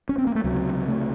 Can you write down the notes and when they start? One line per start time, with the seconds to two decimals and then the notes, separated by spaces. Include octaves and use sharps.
0.09 C#4
0.18 C4
0.27 A#3
0.35 A3
0.44 C#2 C3 F#3
0.88 A3